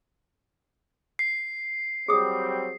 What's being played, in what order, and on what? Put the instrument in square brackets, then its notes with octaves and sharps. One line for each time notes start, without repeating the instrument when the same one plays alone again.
[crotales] C7
[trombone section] F#3 G3 C4 [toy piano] G#4 D#6